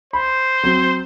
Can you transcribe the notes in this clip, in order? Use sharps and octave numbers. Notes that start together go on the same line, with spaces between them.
C5 B5
F#3 C4